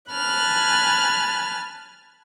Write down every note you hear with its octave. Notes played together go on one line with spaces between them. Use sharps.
G#5 A5 B5 F6 F#6